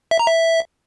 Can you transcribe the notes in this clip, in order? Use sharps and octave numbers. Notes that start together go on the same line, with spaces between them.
E5
A#5
E5